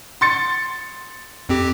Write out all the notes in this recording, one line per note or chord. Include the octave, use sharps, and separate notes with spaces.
C6 A6 C#7
F2 C4 G4